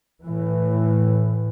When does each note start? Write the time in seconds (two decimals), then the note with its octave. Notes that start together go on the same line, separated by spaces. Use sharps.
0.23 A2 E3